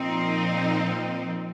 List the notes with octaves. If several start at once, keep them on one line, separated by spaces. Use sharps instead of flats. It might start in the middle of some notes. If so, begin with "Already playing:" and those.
Already playing: A#2 F3 C4 D#4